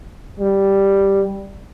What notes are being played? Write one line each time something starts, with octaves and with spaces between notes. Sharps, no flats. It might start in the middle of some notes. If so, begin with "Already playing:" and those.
G3